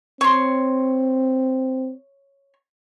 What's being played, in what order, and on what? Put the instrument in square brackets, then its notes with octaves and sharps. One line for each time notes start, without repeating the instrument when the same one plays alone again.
[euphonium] C4 [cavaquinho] C#5 C6